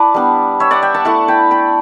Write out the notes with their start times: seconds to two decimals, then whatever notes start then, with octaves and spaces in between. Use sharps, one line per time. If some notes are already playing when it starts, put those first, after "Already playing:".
Already playing: E4 B4 D5 A5
0.14 G3 B3 D4
0.60 C#5 E5
0.71 D5 F#5
0.82 E5 G5
0.94 F#5 A5
1.05 A3 E4 F#5 A5
1.28 G5 B5
1.51 G5 B5